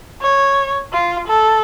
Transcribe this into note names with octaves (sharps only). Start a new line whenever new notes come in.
C#5
F4
A4